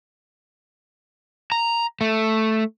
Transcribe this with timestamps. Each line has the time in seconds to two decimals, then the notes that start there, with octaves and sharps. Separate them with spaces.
1.52 A#5
2.01 A3